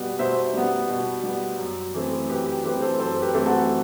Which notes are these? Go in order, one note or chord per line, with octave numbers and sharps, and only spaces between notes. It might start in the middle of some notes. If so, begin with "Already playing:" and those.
Already playing: B2 G3 B3
B2 C5 E5
G3 B3
B2
G3 B3
F#2
E3 A3 C4
F#2 G4 B4
G4
E3 A3 C4 G4 B4
A4 C5
F#2 A4 C5
G4 B4
E3 A3 C4
F#4 A4